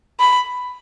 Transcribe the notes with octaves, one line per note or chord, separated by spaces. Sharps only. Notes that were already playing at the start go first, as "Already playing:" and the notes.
B5